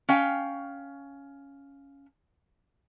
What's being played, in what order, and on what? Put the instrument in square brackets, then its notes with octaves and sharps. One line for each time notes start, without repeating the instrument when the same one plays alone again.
[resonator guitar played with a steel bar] C#4 F5 G5